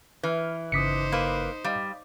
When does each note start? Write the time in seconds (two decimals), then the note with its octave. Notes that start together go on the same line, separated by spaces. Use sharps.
0.23 E3 B4 F6
0.72 G1 C#3 D#4 C5 D6 D#6 B6 C#7
1.12 A#3 B4
1.64 G3 D#5 F5